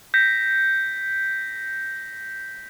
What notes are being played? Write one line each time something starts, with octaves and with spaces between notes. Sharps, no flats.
G6 A#6 B6 C#7